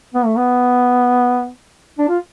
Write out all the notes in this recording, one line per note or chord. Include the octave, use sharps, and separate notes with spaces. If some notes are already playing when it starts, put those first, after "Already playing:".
B3
A3
B3
D4
F4